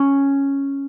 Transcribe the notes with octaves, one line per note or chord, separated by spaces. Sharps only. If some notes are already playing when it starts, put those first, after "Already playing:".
Already playing: C#4